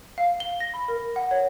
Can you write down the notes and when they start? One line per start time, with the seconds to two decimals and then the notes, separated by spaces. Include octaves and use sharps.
0.18 F5
0.40 G7
0.60 A#6
0.74 B5
0.88 A#4
1.16 F#5
1.31 C#5